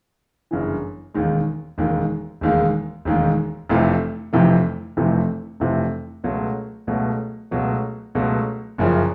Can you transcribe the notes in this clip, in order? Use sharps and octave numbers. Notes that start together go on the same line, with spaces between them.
G1 F#2 C#3 E3
E1 D#2 D#3 G#3
E1 D#2 D#3 G#3
E1 D#2 D#3 G#3
E1 D#2 D#3 G#3
F1 F2 C3 E3 A3
F1 F2 C3 E3 A3
F1 F2 C3 E3 A3
F1 F2 C3 E3 A3
C#2 B2 F#3 A3
C#2 B2 F#3 A3
C#2 B2 F#3 A3
C#2 B2 F#3 A3
F#1 F#2 C#3 F3